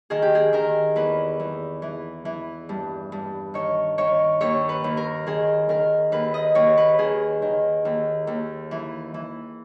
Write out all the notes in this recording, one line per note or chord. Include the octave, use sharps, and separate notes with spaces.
D#3 G#4
G4
G#4
D#3 A#4
E2 B4
E2
E3
E3
G2
G2
D#3 C#5
D#3 C#5
D#2 C#5
B4
D#2
A#4
D#3 G#4
D#3 A#4
D#2 B4
D#5
D#2 C#5
B4
D#3 G#4
D#3
D#2
D#2
E3
E3